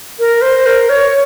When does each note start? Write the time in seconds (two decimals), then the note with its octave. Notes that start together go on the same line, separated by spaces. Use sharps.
0.19 A#4
0.42 C5
0.66 A#4
0.89 C#5